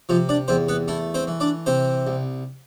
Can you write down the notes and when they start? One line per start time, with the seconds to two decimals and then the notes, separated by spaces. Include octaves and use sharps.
0.09 C3 F3 F4
0.29 D4 D5
0.48 E2 C4 C5
0.68 B3 B4
0.88 A3 E4
1.14 C4 C5
1.27 E3
1.40 D4 D5
1.66 C3 C4 C5
2.07 C2